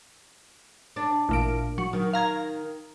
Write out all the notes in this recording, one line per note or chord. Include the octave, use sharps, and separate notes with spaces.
D4
A1 A#2 D7
F#3
D#3
F5 A#5 G#6